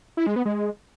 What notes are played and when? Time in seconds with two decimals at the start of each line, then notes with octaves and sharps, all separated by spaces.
0.17 E4
0.27 G#3
0.36 B3
0.45 G#3